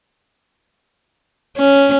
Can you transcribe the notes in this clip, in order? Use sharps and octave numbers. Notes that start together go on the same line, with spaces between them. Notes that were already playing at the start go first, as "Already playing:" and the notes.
C#4